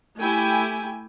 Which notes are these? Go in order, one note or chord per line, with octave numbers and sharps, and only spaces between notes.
A3 E4 G4 G5 G#5